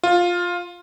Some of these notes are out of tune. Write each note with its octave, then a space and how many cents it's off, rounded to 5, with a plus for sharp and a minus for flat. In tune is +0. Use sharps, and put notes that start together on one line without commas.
F4 +10